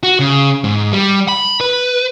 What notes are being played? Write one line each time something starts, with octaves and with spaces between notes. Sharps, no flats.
F#4
C#3
G#2
G3
B5
B4